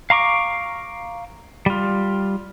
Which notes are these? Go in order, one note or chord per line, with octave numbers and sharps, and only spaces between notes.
F5 A#5 C#6 D6
G3 F4